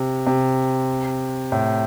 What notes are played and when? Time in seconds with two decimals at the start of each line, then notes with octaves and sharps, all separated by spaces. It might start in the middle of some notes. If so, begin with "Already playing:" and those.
Already playing: C3
0.27 C3
1.52 A2